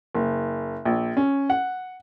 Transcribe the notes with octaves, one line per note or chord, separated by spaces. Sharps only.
F#1
A#1
C#4
F#5